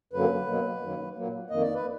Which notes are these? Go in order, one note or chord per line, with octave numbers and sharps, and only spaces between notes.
F#2 D3 F#3 A#3 B4
B2 F#3 A#3
F#2 D#3 F#3 A#3
A#2 F#3 A#3
F2 D#3 A#3 D#5
D5
B4